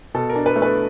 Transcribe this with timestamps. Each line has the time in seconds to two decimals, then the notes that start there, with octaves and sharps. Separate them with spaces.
0.14 B2 A4
0.29 A#4
0.36 D4
0.46 B4
0.56 A3
0.62 B4